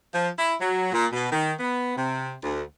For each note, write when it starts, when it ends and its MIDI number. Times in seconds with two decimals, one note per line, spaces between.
0.13 0.28 53
0.38 0.53 64
0.60 0.88 54
0.92 1.06 46
1.13 1.28 47
1.32 1.52 51
1.60 1.93 59
1.96 2.32 48
2.42 2.62 38